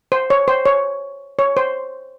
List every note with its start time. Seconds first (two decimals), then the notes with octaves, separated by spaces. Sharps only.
0.12 C5
0.30 C#5
0.48 C5
0.66 C#5
1.39 C#5
1.57 C5